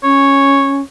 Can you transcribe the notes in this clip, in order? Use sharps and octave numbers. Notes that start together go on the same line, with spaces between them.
C#4 C#5